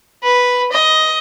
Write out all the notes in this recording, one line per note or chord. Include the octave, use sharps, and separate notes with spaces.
B4
D#5